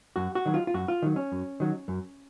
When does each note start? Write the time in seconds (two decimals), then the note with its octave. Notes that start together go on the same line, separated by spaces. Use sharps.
0.16 F#2 F#4
0.35 F#4
0.46 D#3 F#3
0.54 F4
0.67 F4
0.74 F#2 F#4
0.88 F4
1.02 D#3 F#3
1.16 C#4
1.32 F#2
1.60 D#3 F#3
1.88 F#2